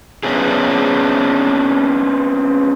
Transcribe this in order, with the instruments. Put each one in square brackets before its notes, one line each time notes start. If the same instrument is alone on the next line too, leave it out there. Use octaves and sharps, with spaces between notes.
[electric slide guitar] B3 C#4 D4 G#4